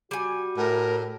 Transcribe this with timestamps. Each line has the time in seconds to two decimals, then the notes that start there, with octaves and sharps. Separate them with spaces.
0.11 G3 F#4 G#5
0.57 A2 A#4